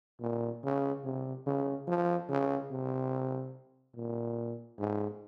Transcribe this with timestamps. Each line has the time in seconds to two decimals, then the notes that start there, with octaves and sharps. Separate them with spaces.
0.21 A#2
0.63 C#3
1.04 C3
1.46 C#3
1.88 F3
2.29 C#3
2.70 C3
3.95 A#2
4.78 G#2